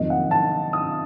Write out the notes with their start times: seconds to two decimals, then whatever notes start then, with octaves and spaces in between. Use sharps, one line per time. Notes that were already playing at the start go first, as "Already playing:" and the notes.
Already playing: F2 C3 D#3 F#3 A#3 D#5
0.10 F#5
0.31 A5
0.73 D#6